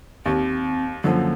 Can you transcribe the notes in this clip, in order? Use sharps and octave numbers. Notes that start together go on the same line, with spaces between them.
D#2 C4
F#2 D3 F3 A#3